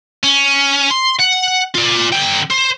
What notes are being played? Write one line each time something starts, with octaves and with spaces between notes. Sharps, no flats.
C#4
C6
F#5
F4 D5
D3 G5
C5